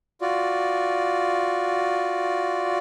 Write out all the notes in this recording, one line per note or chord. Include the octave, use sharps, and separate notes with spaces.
F4 F#4 D5